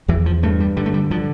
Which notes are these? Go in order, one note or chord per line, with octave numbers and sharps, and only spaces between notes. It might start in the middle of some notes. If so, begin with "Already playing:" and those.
E2 E3
F3
G2 A3
G3
D3 G3
A3
G3
D3 F3